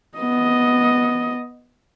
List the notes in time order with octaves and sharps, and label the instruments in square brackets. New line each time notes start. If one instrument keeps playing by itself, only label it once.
[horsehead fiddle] B3 D#5